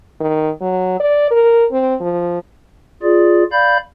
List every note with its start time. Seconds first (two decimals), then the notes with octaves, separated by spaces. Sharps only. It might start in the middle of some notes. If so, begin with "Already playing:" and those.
0.21 D#3
0.61 F#3
1.00 D5
1.31 A#4
1.72 C4
2.01 F3
3.03 F4 G#4 D5
3.52 D5 F5 B5 G6